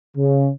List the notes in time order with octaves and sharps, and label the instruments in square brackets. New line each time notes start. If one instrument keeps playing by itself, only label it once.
[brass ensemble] C#3